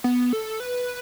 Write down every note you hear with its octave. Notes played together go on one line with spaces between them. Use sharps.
B3
A4
B4